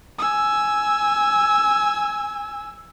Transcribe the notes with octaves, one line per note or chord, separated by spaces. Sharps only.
G#5 E6